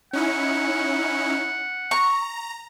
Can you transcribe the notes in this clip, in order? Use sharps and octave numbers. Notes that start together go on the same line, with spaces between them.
C#4 D#4 E4 F#5
A#5 C#6